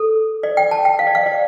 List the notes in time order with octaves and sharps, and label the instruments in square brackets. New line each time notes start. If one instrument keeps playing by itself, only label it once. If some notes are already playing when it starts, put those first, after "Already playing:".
Already playing: [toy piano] A4
D5
G5
A5
G5
F5
D5
F5
D5